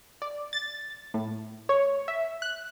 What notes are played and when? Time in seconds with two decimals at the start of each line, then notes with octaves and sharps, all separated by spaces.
0.22 D5
0.53 A6
1.14 A2
1.69 C#5
2.08 E5
2.42 F#6